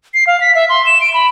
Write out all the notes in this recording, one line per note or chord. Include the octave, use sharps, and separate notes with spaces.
C7
F5
B6
E5
C6
E7
D7
B5